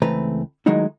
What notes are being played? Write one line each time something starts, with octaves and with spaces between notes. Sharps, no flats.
C#2 E3 A3 C4 B4 A#5
D#3 F#3 G#3 A3 D#4 E4